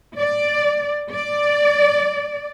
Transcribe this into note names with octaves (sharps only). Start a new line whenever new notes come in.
D5
D5